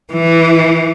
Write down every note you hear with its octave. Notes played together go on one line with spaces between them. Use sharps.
E3